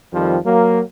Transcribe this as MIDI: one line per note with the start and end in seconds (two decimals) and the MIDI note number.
0.13 0.37 41
0.13 0.37 51
0.13 0.37 53
0.13 0.37 55
0.45 0.80 54
0.45 0.80 58